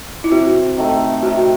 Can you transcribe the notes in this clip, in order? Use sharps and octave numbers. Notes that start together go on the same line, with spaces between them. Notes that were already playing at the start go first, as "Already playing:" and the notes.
E4
C3 F#4
D#3 A3
C3 F#4